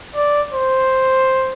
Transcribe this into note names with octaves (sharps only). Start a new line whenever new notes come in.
D5
C5